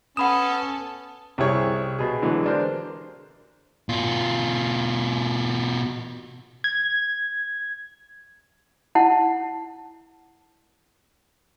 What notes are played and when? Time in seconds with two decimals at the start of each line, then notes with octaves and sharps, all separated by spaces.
0.17 B3 C#4 A4 F#5 B5 D#6 E7
1.38 C2 G3 E4 G#4 C#5
1.99 B2 G#4
2.22 D3 E3 F#3 G#3
2.46 D4 A#4 C5
3.89 B2 F4
6.64 G#6
8.95 E4 F#5 A5